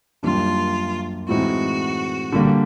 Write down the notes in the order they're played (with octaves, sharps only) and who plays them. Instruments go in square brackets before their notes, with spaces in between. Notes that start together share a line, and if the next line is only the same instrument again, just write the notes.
[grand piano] F#2 D#3 G3 A#3 D4 [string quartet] F4
[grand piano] A2 E3 G#3 C4 D#4 [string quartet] F#4
[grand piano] D3 G3 A#3